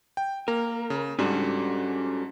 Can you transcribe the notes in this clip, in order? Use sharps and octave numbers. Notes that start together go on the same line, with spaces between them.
G5
A#3 A#4
C#3
G#2 G3 C#4 D4 F#4 A4